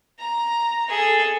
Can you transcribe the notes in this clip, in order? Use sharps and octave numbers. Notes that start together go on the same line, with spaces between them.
A#5
G#4 A4